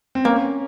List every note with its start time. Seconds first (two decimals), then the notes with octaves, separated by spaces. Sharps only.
0.15 C4
0.25 A#3 C#4